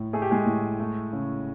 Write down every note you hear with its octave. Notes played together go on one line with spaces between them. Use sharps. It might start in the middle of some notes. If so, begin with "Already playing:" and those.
Already playing: A2
A3 G#4
G4
G#3 G#4
A2
A3
C#3